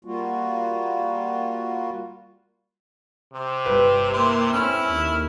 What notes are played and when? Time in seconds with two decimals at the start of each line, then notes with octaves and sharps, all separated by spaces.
0.05 G3 A#3 F4 F#4
3.34 C3 C4
3.66 G1 G3 B4
4.13 A#3 E4 C6
4.53 A3 C4 C#4 E4 F6
4.89 D#2